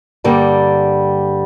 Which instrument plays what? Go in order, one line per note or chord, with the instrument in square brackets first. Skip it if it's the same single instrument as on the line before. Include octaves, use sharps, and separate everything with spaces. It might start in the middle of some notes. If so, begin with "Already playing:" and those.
[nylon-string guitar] G2 D3 G3 A#3